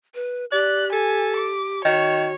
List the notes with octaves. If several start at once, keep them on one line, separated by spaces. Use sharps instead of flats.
B4
G4 D5 F#6
A4 G#5
D6
D#3 F#4 C#5